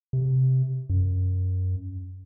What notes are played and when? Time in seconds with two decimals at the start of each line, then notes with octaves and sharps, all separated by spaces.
0.13 C3
0.90 F#2